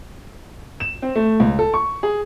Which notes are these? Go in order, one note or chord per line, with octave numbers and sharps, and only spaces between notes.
E7
C4
A3
C#2
A4
C#6
G#4